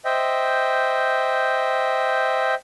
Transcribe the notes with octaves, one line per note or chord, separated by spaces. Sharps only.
C5 D#5 E5 G5